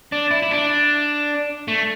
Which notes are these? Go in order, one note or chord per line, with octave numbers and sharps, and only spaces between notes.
D4
E4
E4
D4
A3